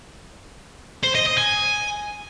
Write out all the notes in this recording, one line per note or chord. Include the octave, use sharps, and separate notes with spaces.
C5
D#5
D#5
G#5